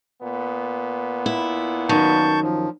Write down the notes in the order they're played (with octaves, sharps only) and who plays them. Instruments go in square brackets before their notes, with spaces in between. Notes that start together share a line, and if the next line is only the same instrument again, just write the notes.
[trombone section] A#2 B3
[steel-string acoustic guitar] E4
[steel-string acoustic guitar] F#2 D#3 F#3 [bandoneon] A5 C#6 G6
[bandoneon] F3